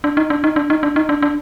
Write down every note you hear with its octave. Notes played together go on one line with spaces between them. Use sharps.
D4
D#4
D4
D#4
D4
D#4
D4
D#4
D4
D4